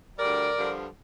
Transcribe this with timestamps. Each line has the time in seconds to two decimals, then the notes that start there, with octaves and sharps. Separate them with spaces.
0.19 D2 D3 G3 A#4 D5
0.57 G2 D3 F3